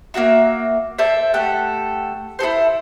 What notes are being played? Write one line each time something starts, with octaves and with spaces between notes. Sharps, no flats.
A#3 D4 F#4 E5
A4 C5 D5 E5
A3 G4 A4 F#5
E4 G#4 A4 C5